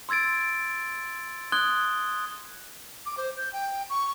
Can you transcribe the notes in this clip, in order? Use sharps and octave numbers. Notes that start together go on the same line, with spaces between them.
C6 E6 G#6 A6 D7
C6 D#6 F#6 G#6 G7
D6
C5
G6
G5
C#6